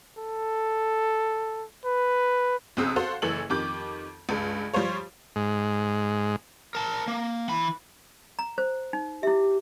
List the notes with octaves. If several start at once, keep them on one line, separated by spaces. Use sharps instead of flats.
A4
B4
B1 C#3 C4 D#6 E6 G6
F#4 A4 C5 F5
F#1 E3 A4 E6 F#7
F2 D#3 G4 D6 G6
C#2 G2
F3 G3 F4 C5 C#5
G#2
A#4 A5
A#3
E3 B5
A#5
C5
D#4
E4 G4 E5